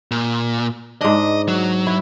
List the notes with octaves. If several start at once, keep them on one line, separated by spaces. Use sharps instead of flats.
A#2
G#2 D4 D#5
F#3
E4